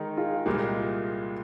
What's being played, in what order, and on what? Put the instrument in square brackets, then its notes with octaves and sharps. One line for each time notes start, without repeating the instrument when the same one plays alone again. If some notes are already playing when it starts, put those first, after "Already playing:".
Already playing: [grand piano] D#3 G#3 D#4
[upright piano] F4 G#4
[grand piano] C2 A#2 G#3 [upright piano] G4 A#4